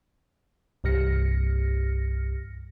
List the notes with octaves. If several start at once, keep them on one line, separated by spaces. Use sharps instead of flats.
C2 G2 G4 F6 A#6 C#7